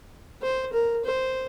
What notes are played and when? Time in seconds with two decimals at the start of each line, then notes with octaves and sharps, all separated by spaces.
0.42 C5
0.73 A#4
1.05 C5